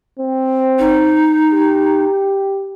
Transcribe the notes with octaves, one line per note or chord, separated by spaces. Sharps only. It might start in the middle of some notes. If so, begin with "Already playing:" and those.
C4
D#4
G4